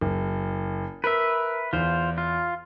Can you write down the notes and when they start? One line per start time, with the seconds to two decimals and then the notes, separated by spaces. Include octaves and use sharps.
0.01 F#1
1.04 A#4 B4 E5
1.73 E2 F4 C5
2.18 F4